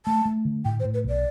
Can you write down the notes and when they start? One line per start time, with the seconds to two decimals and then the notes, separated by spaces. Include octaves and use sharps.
0.06 A3 A5
0.25 A3
0.45 D3
0.65 A2 G5
0.80 C5
0.85 A2
0.94 B4
1.04 B1 D5